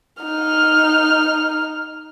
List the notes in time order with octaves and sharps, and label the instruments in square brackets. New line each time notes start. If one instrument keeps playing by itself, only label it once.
[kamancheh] D#4 F6